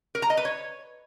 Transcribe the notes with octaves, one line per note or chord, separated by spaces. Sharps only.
A#4
A#5
D#5
B4
C#5